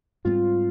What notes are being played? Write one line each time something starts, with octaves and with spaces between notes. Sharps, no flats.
G#2 G3 C4 F4